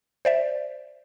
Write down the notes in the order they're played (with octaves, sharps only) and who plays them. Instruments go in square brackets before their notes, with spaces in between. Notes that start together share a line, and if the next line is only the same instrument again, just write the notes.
[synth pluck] C5 D5 E5